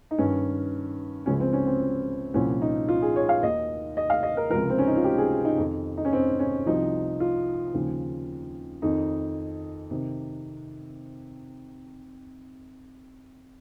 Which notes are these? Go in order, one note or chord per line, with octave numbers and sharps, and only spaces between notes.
D#4
G2 D#3 C#4
C#2 C#3 F3 C#4
C4
C#4
C4
C2 A#2 F3 C#4
D#4
F4
G#4
C#5
F5
D#2 D#3 D#5
D#5
F5
D#5
A#4
C#2 C3 F3 A#4
C4
C#4
D#4
F4
G4
G#4
D#4
F2 D#3
D#4
C#4
C4
C#4
C2 C3 F3 D#4
F4
D#2 C#3 F3
F2 D#3 D#4
C3 D#3